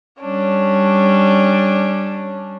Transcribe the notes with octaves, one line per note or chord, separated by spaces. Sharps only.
G3 C#4 D4